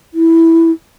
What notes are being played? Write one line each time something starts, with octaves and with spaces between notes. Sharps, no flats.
E4